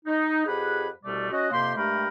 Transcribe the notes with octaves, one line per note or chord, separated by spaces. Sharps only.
D#4
F2 G4 G#4 B4 F#5 B5
C2 B2 G3 A3 D5
C#4 F#4 D#5
F2 C3 A#3 G4 C6
G2 G#3 A3 A#4 G5 B5